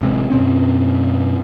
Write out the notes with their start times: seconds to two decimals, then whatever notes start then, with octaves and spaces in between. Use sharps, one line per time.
0.01 A1 C3 G#3
0.30 F#2 B2 C4 C#4